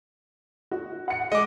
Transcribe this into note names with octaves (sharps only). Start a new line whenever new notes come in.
F#4
F#5 C#7
G#3 D#5 D6